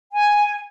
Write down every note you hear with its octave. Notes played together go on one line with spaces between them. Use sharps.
G#5